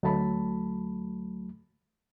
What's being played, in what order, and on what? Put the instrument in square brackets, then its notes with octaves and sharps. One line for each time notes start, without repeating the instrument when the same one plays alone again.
[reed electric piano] D2 F#3 A3 A5 B5